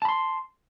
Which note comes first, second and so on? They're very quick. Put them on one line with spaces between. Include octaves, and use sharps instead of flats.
A5 B5 C6